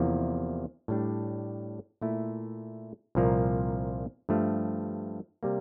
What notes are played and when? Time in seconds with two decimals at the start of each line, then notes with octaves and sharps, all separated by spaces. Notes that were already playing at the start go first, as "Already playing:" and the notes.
Already playing: E2 C3 F3 A#3 E4
0.88 A2 G3 D4
2.02 A#2 A3 E4
3.15 C2 A#2 F3 A#3
4.29 G2 F3 A3
5.43 C3 G3 A#3